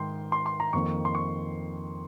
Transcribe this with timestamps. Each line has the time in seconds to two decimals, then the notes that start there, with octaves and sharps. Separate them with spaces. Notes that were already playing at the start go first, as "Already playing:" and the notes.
Already playing: G#2 D#3 G5 C6
0.32 C6
0.46 C6
0.60 A#5
0.73 F2 D#3 A#3 C#6
1.05 C6
1.15 C#6